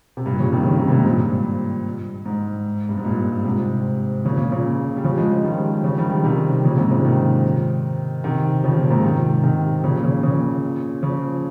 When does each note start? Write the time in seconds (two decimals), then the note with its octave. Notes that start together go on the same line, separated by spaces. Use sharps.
0.17 C3
0.26 G2 A#2
0.39 A#2 C#3
0.53 C3 D#3
0.66 C#3 F3
0.78 C3 D#3
0.88 A#2
0.92 G#2 C3
1.05 G2 A#2
2.26 G#2
2.89 G2
2.97 G#2
3.05 G2 A#2
3.45 G#2 C3
4.25 A#2 C#3
4.38 A#2 C#3
4.51 A#2 C#3
4.97 G3
5.04 C#3 F3
5.18 F3 G#3
5.31 F3 G#3
5.44 D#3 G3
5.84 C#3 F3
5.97 D#3 G3
6.10 D#3 G3
6.24 C3 D#3
6.64 A#2 C#3
6.77 G#2 C3
6.91 A#2 C#3
7.05 C3 D#3
8.24 C3 D#3
8.64 C#3 F3
8.77 A#2 C#3
8.90 G#2 C3
9.03 C3 D#3
9.43 C3 D#3
9.84 A#2 C#3
10.03 A#2 C#3
10.23 A#2 C#3
11.03 C#3 F3